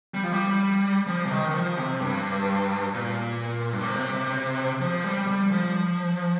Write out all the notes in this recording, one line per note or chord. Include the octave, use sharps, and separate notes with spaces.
G3
F3
G3
F3
C3
D#3
D#3
F3
C3
G2
A#2
G2
A#2
C3
F3
G3
G3
F3